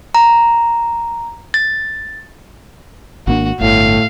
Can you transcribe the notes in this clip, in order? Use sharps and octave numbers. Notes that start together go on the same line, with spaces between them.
A#5
A6
G#1 A#3 D4 F#4
G1 A2 F5